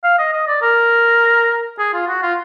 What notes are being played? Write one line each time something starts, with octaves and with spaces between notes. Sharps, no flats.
F5
D#5
D#5
D5
A#4
G#4
F4
F#4
F4